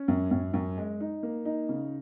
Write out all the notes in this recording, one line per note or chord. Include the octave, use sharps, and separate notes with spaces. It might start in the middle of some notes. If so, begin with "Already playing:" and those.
Already playing: C#4
F#2
F#2
F#2
G#3
D#4
A#3
D#4
C#3